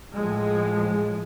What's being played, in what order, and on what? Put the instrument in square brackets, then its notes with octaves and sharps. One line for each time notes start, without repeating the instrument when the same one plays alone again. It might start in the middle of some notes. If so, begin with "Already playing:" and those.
[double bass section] A2 F3 G#3